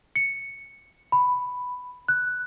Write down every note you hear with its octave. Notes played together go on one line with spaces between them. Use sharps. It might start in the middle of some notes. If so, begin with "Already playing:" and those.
C#7
B5
F#6